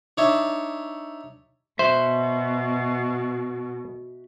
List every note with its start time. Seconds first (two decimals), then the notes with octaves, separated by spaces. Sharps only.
0.18 D4 D#4 C#5 E5
1.79 B2 F#4 C5 E5